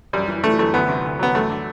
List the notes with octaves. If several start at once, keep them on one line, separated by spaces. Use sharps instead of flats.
F#2 G3
E3
E3 A3
F#2 A3
D2 B3
C3
D2
F#3 B3
F#2 A3
D3